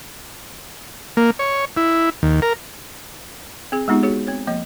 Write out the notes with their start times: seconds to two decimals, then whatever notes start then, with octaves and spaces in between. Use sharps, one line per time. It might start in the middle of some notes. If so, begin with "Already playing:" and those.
1.17 A#3
1.39 C#5
1.77 E4
2.23 D#2
2.42 A#4
3.72 C4 G#4
3.88 G#3 B3 D#4 F4 G4
4.03 F#4 G#4 C#5
4.27 C4 C#5
4.47 F3 A#3 D#5